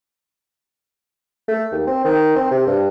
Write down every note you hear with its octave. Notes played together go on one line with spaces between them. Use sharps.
A3
D#2
C4
D#3
C4
C3
G2